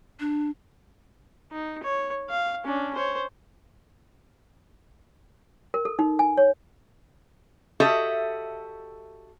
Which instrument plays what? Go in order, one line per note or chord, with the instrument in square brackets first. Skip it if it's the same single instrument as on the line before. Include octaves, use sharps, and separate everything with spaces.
[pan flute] D4
[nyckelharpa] D#4
C#5
F5
C#4 D4
C5 C#5
[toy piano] A#4
A4
D#4
G#5
C#5
[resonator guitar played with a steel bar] F#4 G4 A4 D#5 E5